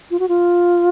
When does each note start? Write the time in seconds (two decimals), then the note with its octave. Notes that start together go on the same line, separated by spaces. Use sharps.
0.11 F4
0.19 F#4
0.28 F4